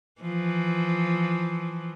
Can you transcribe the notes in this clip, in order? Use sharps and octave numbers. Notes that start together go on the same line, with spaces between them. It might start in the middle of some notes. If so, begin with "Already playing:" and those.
E3 F3